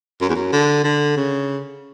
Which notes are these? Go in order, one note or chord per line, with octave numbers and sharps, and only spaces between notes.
F#2
E2
F#2
D3
D3
C#3